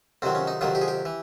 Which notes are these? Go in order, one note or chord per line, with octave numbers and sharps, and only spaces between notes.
F2 C3 D#3 F#3 C4
C#4
D#4
F2 C3 D#3 F#3 F4
G4
G#4
G4
E3